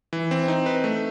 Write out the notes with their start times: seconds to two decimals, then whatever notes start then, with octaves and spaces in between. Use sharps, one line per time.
0.13 E3
0.31 C4
0.48 D#4
0.66 B4
0.84 A3